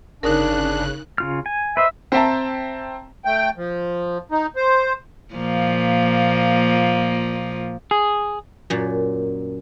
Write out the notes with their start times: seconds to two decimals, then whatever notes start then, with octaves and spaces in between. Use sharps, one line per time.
0.23 G1 C#3 D4 D#4 A#4 F#6
1.18 C#3 F4 F6
1.46 G#5
1.77 B4 C5 D#5 E5
2.12 C4 C5 E5 G5 A5 A#5
3.25 A3 G5
3.57 F3
4.32 D#4
4.56 C5
5.34 A#2 F3 A#3
7.91 G#4
8.70 F#2 A#2